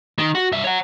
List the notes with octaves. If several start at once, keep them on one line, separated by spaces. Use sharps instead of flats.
D#3
F#4
G2 E5
C#5 F#5